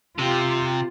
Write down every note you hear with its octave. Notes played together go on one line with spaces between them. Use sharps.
C3 F4 G4